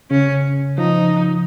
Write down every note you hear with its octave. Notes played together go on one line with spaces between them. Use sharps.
C#3 C#4
F3 D#4